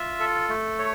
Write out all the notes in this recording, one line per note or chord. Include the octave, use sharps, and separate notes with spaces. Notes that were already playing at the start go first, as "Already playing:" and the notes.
Already playing: F4 E5
A4
A3
C#5